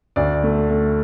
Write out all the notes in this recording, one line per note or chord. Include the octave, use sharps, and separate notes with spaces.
D2 D5
A3
A3